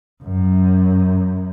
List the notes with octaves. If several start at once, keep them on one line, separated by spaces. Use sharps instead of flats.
F#2